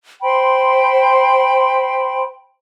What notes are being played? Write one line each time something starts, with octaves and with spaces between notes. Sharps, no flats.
C5 G5 B5 C6